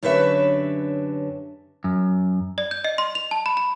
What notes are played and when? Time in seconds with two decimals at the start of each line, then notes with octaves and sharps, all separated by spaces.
0.03 F#2 D3 G4 B4 C#5 E5
1.84 F#2
2.58 D5
2.71 G6
2.84 D#5
2.98 C6
3.15 F7
3.31 A5
3.46 B5
3.57 B5